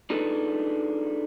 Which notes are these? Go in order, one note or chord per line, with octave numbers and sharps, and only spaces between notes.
D4 D#4 F4 G#4 A4 B4